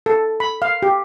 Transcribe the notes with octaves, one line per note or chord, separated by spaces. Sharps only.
A4
B5
F5
G4